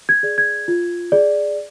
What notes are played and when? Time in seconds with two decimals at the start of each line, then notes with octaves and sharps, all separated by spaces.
0.09 G#6
0.23 G#4 D5
0.38 G#6
0.68 F4
1.12 G#4 D5